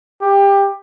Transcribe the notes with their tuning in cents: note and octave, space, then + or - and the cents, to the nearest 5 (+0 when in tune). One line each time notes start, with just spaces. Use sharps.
G4 +20